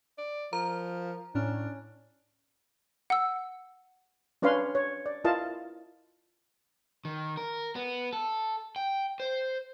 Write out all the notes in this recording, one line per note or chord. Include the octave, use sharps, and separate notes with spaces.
D5
F3 A#4 A#5
A2 C#4 D4 F6
F#5 E6
C#4 D4 B4 C#5 F5 C6
C#5
D5
E4 F4 A#4 D#5 F5 A5
D#3
A#4
B3
A4
G5
C5